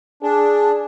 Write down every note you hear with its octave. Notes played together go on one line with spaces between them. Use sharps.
D4 G#4